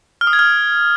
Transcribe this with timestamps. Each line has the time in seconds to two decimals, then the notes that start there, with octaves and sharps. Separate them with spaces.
0.21 F6
0.27 D#6
0.33 G#6
0.39 F6